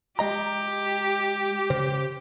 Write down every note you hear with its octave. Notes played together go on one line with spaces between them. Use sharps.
G#3 G4 D#5 A#5
C#3 C5